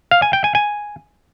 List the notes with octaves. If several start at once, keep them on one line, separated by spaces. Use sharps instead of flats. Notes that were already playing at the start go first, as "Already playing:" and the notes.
F5
G#5
G5
G#5
G#5